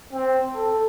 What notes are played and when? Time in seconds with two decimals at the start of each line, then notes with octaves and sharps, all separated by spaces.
0.13 C4
0.54 A4